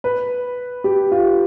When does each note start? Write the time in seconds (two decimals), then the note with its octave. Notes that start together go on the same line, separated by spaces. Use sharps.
0.04 B4
0.84 G4
1.12 F4